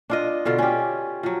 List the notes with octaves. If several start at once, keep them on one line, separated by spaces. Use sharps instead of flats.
D4 F4 D#5
B2 D3 F4
C#4 G4
F3 F#3